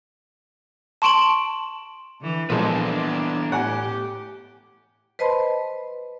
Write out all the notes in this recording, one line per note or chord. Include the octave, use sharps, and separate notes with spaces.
A5 C6 C#6 D7 E7 F#7
D3 E3
A#2 E3 F3 G#3 B3 D4 A4 B4
A2 G4 F#5 G#5
B4 C5 D#5 A5 B5 C6